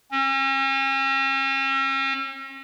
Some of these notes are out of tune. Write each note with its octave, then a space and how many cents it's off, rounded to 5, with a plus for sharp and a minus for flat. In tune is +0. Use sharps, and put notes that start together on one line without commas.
C#4 -40